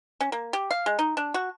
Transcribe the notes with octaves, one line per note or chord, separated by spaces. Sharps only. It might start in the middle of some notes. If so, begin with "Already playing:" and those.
C#4
A#3
G4
F5
G#3
D#4
D4
F#4